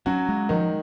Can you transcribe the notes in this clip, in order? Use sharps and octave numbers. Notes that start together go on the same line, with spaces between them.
F#3 C#4 F#4
G#3
D#3 F3 D#4